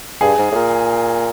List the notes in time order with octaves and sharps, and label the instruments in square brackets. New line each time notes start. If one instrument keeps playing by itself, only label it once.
[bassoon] G2 [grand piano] G#4
[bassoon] G#2
A2
A#2